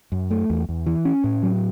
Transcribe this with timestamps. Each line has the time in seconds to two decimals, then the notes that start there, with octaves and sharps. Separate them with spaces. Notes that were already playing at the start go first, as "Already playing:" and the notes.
0.12 F#2
0.31 A3
0.50 E2
0.69 E2
0.86 E3
1.05 C#4
1.24 A2
1.43 F#3